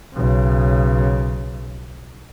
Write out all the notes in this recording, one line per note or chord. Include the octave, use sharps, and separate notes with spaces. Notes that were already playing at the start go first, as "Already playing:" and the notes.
B1 C#3